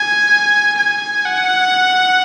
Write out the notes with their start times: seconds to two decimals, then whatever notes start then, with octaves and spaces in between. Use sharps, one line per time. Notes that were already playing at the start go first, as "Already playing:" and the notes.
Already playing: G#5
0.77 G#5
1.26 F#5